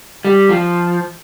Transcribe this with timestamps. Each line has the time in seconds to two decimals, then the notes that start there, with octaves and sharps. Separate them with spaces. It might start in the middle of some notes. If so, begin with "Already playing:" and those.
0.25 G3
0.49 F3